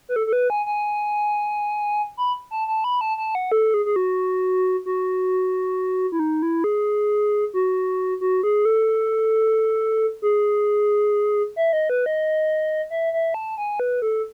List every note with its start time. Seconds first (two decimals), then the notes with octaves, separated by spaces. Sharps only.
0.09 B4
0.16 A4
0.27 A4
0.33 B4
0.50 G#5
0.66 G#5
2.17 B5
2.51 A5
2.68 A5
2.84 B5
3.01 A5
3.17 A5
3.35 F#5
3.52 A4
3.74 G#4
3.86 G#4
3.96 F#4
4.86 F#4
6.12 E4
6.19 D#4
6.42 E4
6.64 G#4
7.54 F#4
8.21 F#4
8.43 G#4
8.65 A4
10.22 G#4
11.56 E5
11.73 D#5
11.90 B4
12.06 D#5
12.90 E5
13.13 E5
13.34 A5
13.58 G#5
13.80 B4
14.02 A4